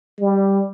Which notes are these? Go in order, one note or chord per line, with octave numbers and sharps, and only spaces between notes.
G3